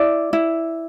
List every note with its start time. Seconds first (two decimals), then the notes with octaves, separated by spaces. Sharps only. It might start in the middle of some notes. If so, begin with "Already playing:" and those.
Already playing: E4 D5
0.33 E4